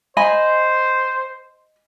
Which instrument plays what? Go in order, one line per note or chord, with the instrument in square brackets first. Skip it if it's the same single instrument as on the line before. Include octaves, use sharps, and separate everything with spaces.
[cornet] C5 [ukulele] D#5 G#5 B5